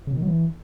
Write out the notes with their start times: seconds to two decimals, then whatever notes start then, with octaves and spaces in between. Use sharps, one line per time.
0.07 C#3
0.12 B2
0.17 D#3
0.22 F#3
0.27 E3